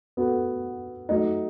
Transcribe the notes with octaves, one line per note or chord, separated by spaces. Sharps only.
B3 F#4 A4
F#3 A3 D#4